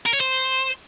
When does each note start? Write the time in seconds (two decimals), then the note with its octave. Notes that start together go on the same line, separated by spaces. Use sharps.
0.06 A#4
0.13 C#5
0.20 C5